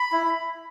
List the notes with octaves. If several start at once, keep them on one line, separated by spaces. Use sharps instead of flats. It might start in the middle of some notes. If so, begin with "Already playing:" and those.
Already playing: B5
E4